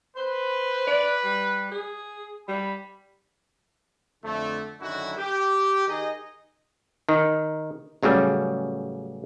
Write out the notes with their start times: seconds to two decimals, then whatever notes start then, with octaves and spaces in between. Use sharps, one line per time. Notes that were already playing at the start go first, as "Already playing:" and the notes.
0.17 B4 C5
0.87 D5
1.24 G3
1.72 G#4
2.48 G3 B5
4.24 F2 D3 A3
4.80 F#2 D3 D#3 F#3 E4 F#4
5.18 G4
5.88 D#3 D#4 G#4 D#5
7.09 D#3
8.03 A1 C#3 F#3 G3